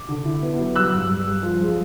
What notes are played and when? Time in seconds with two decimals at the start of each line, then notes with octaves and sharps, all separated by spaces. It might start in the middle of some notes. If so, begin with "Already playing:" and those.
Already playing: D6
0.09 D3
0.25 E4
0.42 B3
0.59 F#3
0.76 G3 E6 F#6
0.93 G2
1.09 G3
1.27 G3
1.43 F3
1.61 G#3